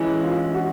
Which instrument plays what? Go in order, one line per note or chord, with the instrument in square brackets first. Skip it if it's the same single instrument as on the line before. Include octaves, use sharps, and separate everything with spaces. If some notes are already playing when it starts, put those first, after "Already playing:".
Already playing: [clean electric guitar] E3 G#3 C#4 [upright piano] E4
[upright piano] F4
F#4